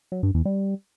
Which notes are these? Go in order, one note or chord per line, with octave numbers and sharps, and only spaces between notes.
F#3
G2
E2
G3